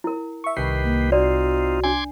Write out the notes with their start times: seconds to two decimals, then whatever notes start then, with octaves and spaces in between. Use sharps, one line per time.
0.04 E4 A#4
0.44 E5 C#6
0.57 C2 D#3 G4 B4 C7
0.84 A#3
1.12 C4 D#4 F4 F#4 D5
1.84 D4 G#5 C6 D6 G#6